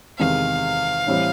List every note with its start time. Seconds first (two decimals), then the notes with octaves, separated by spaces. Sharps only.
0.19 E2 C3 D#3 G#3 F5
1.07 A2 E3 G3 C4